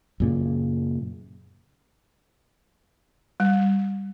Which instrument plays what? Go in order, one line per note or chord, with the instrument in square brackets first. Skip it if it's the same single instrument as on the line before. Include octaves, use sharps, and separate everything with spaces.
[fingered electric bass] F#2 A#2 C#3
[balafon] G3